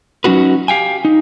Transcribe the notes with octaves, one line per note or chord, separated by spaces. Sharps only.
F#3 C#4 D#4 F#4 B4
G4 F5 G5 G#5
D#4